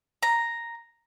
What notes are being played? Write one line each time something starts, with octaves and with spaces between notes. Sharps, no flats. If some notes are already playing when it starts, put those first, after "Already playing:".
A#5